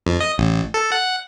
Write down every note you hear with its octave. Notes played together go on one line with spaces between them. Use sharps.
F2
D#5
A1
A4
F#5